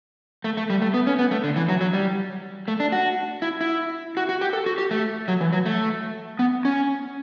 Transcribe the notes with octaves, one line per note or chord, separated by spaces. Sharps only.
A3
A3
G3
A3
B3
C#4
B3
A3
D3
E3
F#3
F#3
G3
A3
D4
F#4
E4
E4
F#4
F#4
G4
A4
F#4
G4
A3
F#3
E3
F#3
A3
B3
C#4